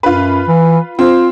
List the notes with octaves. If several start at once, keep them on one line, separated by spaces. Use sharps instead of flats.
F#2 F4 B4
E3
C4 F4